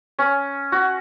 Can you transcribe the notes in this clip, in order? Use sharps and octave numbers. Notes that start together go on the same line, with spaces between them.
C#4
F#4